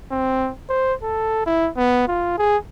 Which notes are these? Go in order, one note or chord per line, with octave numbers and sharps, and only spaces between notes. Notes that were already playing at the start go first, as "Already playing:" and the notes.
C4
C5
A4
E4
B3
F4
G#4